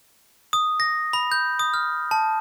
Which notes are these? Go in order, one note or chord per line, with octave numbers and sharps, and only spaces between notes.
D#6
A#6
B5
G6
D#6
F6
A5